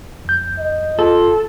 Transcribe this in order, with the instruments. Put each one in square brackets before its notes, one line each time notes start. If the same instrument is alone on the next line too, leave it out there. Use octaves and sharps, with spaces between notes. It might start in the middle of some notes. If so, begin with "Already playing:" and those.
[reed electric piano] F2 G6
[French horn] D#5
[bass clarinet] F4 [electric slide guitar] A4